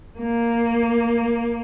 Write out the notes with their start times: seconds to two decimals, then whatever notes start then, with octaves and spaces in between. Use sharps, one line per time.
0.19 A#3